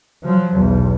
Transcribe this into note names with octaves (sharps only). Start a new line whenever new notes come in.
F3 F#3
B1 E2